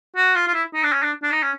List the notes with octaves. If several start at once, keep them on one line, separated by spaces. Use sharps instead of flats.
F#4
F4
F4
E4
D#4
D4
C#4
D4
D4
D#4
C#4